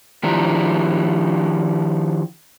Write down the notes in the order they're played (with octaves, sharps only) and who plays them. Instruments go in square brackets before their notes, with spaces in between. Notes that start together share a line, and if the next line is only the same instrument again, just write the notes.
[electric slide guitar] D#3 F3 D4 E4 G4 A#5